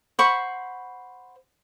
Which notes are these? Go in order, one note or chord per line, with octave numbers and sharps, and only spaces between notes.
C5 F#5 B5 C#6